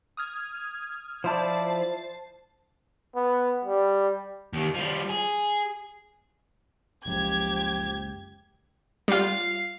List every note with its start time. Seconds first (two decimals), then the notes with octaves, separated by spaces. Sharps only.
0.17 D#6 F6 G#6
1.24 F3 E4 C5 D5 A5
3.16 B3
3.65 G3
4.53 D#2 D#3
4.75 F3 G3
5.10 G#4
7.06 F#1 C#2 F3 G4 G#6
9.08 G3 F4 F5